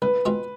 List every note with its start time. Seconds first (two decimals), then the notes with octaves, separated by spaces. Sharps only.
0.02 C2 B4
0.25 B2 G#3 C4 F4